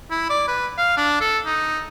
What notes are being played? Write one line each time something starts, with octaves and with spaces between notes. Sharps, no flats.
E4
D5
B4
F5
D4
A4
D#4